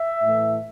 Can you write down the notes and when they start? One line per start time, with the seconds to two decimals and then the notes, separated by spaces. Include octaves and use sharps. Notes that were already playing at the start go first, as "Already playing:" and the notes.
Already playing: E5
0.23 A2 E3 A3